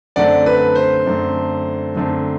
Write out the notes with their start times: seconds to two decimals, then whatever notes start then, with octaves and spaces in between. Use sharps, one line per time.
0.16 F#2 D3 A3 C4 D5 F#5
0.46 B4
0.75 C5
1.06 F#2 D3 A3 C4
1.96 F#2 D3 A3 C4